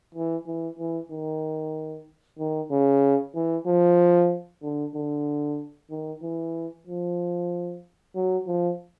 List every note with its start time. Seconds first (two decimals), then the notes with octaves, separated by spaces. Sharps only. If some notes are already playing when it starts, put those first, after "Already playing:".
0.15 E3
0.47 E3
0.79 E3
1.11 D#3
2.39 D#3
2.71 C#3
3.35 E3
3.67 F3
4.63 D3
4.95 D3
5.91 D#3
6.23 E3
6.87 F3
8.15 F#3
8.47 F3